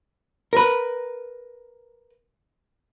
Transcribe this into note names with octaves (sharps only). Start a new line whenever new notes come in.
A#4 B4